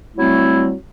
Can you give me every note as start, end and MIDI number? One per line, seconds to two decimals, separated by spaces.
0.17 0.73 54
0.17 0.73 55
0.17 0.73 57
0.17 0.73 60
0.17 0.73 64